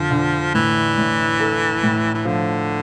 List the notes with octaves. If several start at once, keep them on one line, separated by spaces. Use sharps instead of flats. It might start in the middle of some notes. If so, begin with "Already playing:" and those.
Already playing: F2 D3 F3
D3
A2 E3
A2
A4
A2
E3
D3 F3